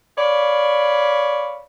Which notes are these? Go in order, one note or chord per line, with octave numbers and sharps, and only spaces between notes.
C#5 D5 F5 B5